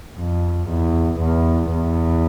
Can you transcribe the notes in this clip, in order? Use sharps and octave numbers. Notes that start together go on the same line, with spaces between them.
F2
E2
E2
E2